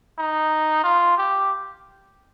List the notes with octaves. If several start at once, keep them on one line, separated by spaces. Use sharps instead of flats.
D#4
F4
G4